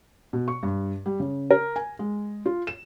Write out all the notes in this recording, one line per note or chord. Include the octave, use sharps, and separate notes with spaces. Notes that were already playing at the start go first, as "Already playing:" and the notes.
B2
C#6
G2
G3
C#3
A#4
G#5
G#3
F4
E7